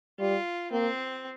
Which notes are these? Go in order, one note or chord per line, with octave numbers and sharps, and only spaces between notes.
G3 F4
A#3 C4